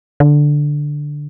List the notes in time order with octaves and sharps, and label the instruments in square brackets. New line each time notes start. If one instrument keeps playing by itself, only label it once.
[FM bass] D3